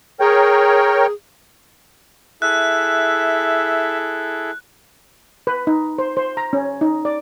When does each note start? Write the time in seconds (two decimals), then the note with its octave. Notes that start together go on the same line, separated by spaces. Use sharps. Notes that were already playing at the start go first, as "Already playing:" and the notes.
0.20 G#4 A#4 C#5 G5
2.42 E4 G#4 A4 E5 F#6
5.47 B4
5.67 D#4
5.98 C5
6.17 C5
6.37 A#5
6.53 C#4
6.81 D#4
7.05 D5